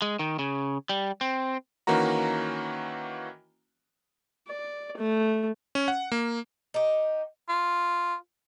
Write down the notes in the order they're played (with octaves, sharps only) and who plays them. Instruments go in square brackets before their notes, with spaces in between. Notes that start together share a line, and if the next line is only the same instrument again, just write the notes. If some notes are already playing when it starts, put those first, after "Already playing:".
[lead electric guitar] G#3
D#3
C#3
G3
C4
[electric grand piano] D#3 E3 A#3 C#4 F#4 A#5
[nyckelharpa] D5
A3
[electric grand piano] C#4
F#5
A#3
[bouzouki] D#4 G4
[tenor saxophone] F4